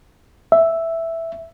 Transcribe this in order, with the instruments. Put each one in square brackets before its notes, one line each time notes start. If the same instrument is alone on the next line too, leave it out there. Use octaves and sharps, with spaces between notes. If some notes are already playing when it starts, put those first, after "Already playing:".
[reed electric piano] E5